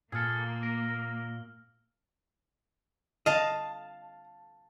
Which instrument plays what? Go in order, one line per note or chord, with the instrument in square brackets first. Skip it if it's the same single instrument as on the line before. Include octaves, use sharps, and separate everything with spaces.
[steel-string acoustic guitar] A#2 [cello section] A#3 [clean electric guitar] G#4 A4 [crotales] E6 F6
[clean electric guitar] A#4
[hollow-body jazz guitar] D#5 [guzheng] F5 A5